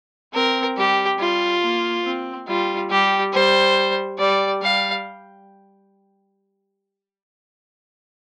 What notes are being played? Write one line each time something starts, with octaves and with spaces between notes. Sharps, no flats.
C4 A#4
G3 G4
G3 F4
A#3
C4
G3 F4
G3 G4
G3 C5
G3 D5
G3 F5